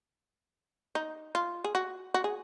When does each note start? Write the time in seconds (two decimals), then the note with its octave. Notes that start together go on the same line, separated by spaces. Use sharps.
0.95 D#4
1.35 F4
1.64 G#4
1.75 F#4
2.14 F#4
2.24 G#4